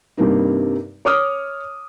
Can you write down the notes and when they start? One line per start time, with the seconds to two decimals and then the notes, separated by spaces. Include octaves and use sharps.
0.17 G2 C3 G3 A#3 D#4
1.05 C#5 D6 D#6 F6